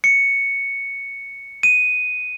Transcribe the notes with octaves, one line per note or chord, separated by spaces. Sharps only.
C#7
D#7